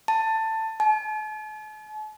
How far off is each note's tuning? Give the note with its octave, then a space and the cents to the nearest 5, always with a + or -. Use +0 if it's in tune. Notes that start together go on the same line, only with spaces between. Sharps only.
A5 +15
A5 -45